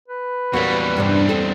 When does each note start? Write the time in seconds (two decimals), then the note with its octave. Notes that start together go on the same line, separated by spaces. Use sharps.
0.08 B4
0.53 E2 F#3 G3 A#3 F#4
0.97 G2 C3 D4
1.29 C4 A4